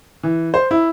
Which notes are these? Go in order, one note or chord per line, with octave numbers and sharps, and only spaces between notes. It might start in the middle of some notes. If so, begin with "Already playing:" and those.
E3
C5
E4